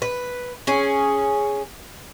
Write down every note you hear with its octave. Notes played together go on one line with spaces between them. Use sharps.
B4
C#4 G#4